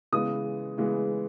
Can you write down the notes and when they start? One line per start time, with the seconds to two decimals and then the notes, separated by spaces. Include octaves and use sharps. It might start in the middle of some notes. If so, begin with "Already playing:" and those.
0.12 C#3 E3 G#3 B3 D#6
0.78 C#3 E3 G#3 B3